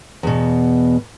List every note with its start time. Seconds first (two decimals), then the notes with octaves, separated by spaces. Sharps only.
0.23 E2 B2